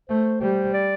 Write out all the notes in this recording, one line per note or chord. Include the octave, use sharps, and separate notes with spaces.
A3 C5
G3 C5
D5